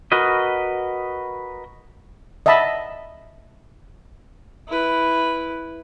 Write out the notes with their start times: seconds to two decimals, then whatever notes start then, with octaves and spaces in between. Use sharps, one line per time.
0.12 F#4 A#4 B4 D#5
2.46 D#5 E5 F#5 A5 B5
4.68 E4 B4